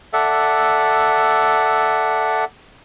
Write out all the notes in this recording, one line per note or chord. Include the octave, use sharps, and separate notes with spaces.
A4 D5 E5 F#5